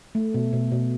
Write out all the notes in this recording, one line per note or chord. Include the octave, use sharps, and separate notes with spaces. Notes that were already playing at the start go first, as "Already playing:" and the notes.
A3
B2
B2
B2